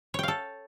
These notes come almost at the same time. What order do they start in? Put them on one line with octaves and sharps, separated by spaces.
C#5 G5 F5 A4